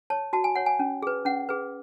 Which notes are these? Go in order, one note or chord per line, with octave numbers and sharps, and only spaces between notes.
C#5 A5
F#4 A5
G#5
C#5 F#5
G#5
C#4
G#4 B4
C#4 F#5
G#4 B4